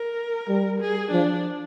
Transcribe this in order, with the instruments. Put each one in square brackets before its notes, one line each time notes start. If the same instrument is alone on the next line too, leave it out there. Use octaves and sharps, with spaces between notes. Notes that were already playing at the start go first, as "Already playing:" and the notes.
Already playing: [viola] A#4
[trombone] G3
[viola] G#4
[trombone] F3 [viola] D4